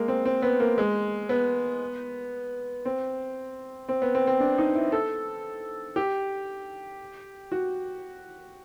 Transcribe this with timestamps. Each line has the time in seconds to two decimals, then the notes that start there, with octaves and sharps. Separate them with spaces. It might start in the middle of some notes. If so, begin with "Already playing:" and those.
Already playing: G#3 A#3
0.08 C4
0.25 C4
0.42 B3
0.60 A#3
0.78 G#3
1.29 B3
2.85 C4
3.89 C4
4.02 B3
4.15 C4
4.27 C4
4.40 D4
4.58 D#4
4.75 E4
4.92 A4
5.96 G4
7.52 F#4